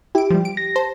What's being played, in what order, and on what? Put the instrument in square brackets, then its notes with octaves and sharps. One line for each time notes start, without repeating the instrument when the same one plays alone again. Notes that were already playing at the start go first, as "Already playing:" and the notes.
[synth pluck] E4 D7 [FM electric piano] G4
[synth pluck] F3 G3
D7
[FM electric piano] A#6
[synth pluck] C5 [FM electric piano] A5